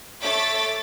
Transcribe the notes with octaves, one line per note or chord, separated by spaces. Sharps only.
A3 A4 C#5 D6 A6 B6